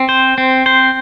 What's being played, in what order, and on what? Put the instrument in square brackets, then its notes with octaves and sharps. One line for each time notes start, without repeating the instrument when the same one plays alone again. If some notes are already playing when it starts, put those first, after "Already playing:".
Already playing: [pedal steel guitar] C4
C5
C4
C5